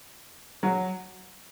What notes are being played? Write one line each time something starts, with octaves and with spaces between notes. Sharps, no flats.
F#3 F#4